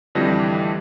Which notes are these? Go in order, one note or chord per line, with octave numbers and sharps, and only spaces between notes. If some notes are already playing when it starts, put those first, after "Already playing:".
F2 D3 E3 G3 A3 A#6